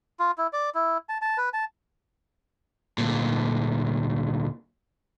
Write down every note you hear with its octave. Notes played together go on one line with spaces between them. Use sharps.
F4
E4
D5
E4
A5
A5
B4
A5
D2 A#2